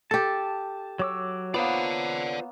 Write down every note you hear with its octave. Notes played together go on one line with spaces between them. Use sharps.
G4 A4 A5
F#3 C#5 D6 E6
A#3 B3 F4 B4 C5 D5 F#5